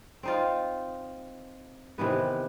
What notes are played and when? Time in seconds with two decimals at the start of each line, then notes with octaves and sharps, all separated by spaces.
0.23 C4 D#4 F4
1.98 C3 D#3 E3 B3